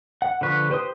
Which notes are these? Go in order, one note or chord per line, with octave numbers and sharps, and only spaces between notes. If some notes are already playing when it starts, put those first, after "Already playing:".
F#5
D3 F3 B4 C#6
G4 B4 C5 C6 D#6